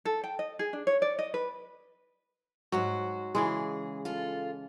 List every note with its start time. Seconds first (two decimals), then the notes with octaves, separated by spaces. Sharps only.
0.05 A4
0.24 G5
0.39 D#5
0.59 G#4
0.73 D4
0.87 C#5
1.02 D5
1.19 D#5
1.34 B4
2.72 G#2 F#3 F#4 C5
3.35 C#3 E3 G#3 G#4
4.05 F4 A4